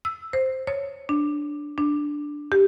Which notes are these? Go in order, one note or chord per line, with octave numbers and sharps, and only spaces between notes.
E6
C5
C#5
D4
D4
G4